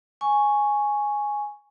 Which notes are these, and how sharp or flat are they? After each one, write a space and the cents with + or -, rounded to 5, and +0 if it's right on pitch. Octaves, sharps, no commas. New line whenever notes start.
G#5 +0 C#6 +0